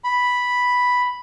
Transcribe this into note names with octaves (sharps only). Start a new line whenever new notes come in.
B5